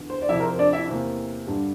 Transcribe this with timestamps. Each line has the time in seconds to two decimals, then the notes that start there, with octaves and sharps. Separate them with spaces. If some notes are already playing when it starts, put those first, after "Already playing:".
Already playing: E2 D3
0.10 C5
0.22 D5
0.29 F2 C3 F3 E4 E5
0.40 A#4
0.43 C5
0.59 D4 D5
0.73 E4 E5
0.88 E2 C3 E3 A#3
1.47 G2 D3 G3